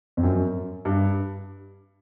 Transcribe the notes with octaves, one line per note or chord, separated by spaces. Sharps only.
F2
F#2
G2